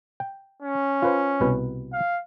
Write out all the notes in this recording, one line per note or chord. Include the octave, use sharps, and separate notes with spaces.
G5
C#4
F4 B4 C5
C2 B2 B4
F5